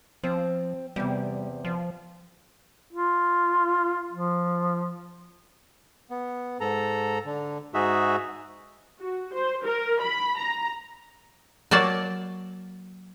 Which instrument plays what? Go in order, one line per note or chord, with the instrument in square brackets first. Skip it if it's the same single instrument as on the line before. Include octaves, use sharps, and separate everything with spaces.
[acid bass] F3 [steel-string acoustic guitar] C4
[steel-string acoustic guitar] E2 C3 [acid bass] G3
[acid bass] F3
[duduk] F4
F3
[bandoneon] B3
G#2 A4 A#5
D3
G#2 D#4 F#4 G#4 E5
[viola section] F#4
C5
A#4
B5
A#5
[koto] F#3 A#3 D5 A5